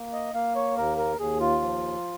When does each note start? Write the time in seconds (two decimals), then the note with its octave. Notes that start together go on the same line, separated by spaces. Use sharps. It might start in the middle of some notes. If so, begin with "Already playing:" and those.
Already playing: A#3
0.13 D#5
0.34 A#3 F5
0.56 C#5
0.77 D#2 A#4
0.98 A#4
1.19 D#2 G#4
1.40 F4
1.61 F3